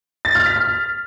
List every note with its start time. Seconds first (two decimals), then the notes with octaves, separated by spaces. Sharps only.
0.25 A6
0.35 F6
0.46 B6
0.56 F6